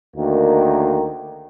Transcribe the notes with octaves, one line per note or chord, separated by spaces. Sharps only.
D2 D#3 A#3